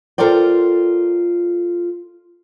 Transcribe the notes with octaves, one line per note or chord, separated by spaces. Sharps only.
F4 A4 A#4 C5 D5 G5